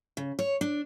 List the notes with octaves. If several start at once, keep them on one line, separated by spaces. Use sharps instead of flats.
C#3
C#5
D4